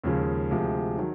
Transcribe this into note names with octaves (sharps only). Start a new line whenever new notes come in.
D#2 C#3 F3 G#3
D2 C3 F3 G#3
D#3 F#3